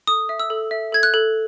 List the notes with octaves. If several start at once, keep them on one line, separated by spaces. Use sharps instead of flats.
A4 D#6
E5
E6
A4
E5
A4 G#6
F#6
A4